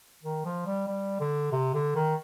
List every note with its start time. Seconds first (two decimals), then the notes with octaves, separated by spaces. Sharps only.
0.23 D#3
0.45 F3
0.66 G3
0.87 G3
1.20 D3
1.52 C3
1.74 D3
1.95 D#3